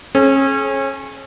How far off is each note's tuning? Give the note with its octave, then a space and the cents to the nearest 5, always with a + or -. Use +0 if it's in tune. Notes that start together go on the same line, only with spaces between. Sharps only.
C#4 -30 G#4 +40